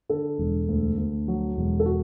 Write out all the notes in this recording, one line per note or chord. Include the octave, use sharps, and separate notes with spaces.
D3 A4
E1
D2
D2
F#3
E1
A4
F#4